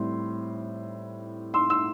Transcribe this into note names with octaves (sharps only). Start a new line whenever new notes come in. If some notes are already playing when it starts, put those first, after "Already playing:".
Already playing: A2 G3 C4 C6
C6 E6
C6 E6